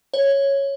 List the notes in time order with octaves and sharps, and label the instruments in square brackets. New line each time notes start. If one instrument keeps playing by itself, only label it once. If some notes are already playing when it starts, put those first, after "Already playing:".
[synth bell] C#5